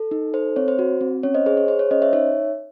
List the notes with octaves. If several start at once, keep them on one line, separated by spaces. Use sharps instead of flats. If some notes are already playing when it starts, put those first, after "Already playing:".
Already playing: A4
D#4
A4 C5
C4 C#5
C5
F#4
C4
C#4 C#5
C5 D#5
G#4 C5
C#5
G#4 C5
C#5
C#4 C5 D#5
C#5 E5
D#4 C#5 E5